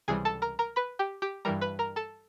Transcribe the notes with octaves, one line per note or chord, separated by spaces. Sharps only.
C#2 C3 E3 G3 G#4 G#5
A4 A5
A#4 A#5
A#4 A#5
B4 B5
G4 G5
G4 G5
G2 E3 G3 A#4 A#5
B4 B5
A#4 A#5
A4 A5